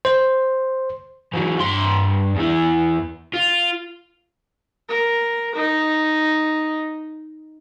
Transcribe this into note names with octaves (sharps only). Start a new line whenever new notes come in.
C5
E3 F#3
G2 C6
E2 E3
F4
A#4
D#4